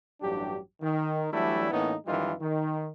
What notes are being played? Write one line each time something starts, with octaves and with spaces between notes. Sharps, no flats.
A1 G2 F#3 D4 G4
D#3
E3 F#3 G3 A3 D4 E4
A2 E3 A#3 B3 C#4 D#4
F#2 D#3 E3 G3 D#4 F4
D#3